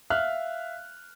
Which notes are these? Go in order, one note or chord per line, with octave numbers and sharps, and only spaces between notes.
E5 F5 F6 F#6